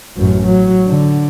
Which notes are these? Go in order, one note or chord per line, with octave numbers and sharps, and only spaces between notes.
A1 F#2
F#3
D3